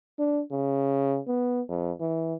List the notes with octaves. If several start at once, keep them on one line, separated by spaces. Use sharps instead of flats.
D4
C#3
B3
F2
E3